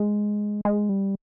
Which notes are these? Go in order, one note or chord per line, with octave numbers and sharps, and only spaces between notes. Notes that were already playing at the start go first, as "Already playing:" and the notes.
Already playing: G#3
G#3
G3